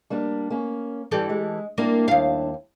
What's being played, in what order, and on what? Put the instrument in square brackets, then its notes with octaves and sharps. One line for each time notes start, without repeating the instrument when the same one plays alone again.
[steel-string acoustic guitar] G3 A#3 D4
A#3 C#4
[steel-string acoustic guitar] G2 G3 [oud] E3 G4 A4
[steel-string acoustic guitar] G#3
[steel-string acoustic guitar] G3 D4 E4 [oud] A#3
[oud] D#2 F5